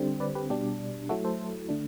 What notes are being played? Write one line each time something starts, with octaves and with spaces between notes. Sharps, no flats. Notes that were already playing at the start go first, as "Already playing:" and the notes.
Already playing: D3 G3 C4
B4 D5
G4 B4
B2 G3 D4 G4
F#3 A3 E4 F#4 A4
A4 C5
D3 A3 D4